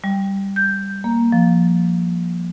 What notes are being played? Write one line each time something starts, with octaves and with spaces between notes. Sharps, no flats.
G3
G6
A#3
F3